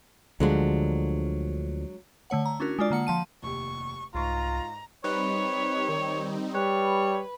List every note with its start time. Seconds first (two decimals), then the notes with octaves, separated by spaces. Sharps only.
0.40 D2 D3 F3 F#3 G#3 D4
2.30 D3 A3 C#5 F#5
2.45 A#5
2.60 C#4 D4 E4 F#4 A#4
2.79 G#3 D4 F4 D5
2.90 D3 A#3 F#5 C#7
3.07 F3 A5 D#7
3.43 F1 D#2 G4 C#6
4.14 C2 G#2 F4 A#5 C#6
5.04 G3 C4 D#4 B4 C#5
5.89 D#3
6.54 G3 B4 C#5